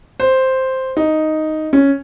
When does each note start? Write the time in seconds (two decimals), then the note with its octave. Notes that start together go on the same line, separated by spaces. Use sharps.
0.20 C5
0.97 D#4
1.73 C#4